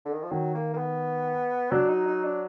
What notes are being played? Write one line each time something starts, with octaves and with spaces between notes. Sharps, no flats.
D3
D#3
F3
D#3 F#3
A#3
A#3
B3
F#3 D4
D#4
D#4
D4